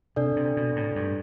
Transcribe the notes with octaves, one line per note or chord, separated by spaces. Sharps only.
C3 D4 A4 D5
C3
B2
A2
G2